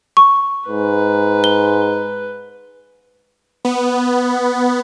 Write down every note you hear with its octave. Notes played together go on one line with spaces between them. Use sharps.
C#6
G#2 B4
G7
B3